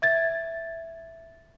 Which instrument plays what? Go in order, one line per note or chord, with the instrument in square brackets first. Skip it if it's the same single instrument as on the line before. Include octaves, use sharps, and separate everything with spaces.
[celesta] E5 G#6 A6